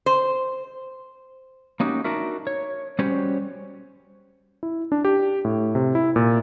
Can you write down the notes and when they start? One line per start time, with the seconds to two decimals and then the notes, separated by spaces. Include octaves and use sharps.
0.06 C5
1.80 A#3 C#4 D#4 F#4 G4
2.04 D4 D#4 F#4 A#4 E5
2.47 C#5
2.99 G3 C#4 F#4 G4 C5 C#5
4.63 E4
4.92 D4
5.05 G4
5.45 A2
5.75 C3
5.95 E4
6.16 A#2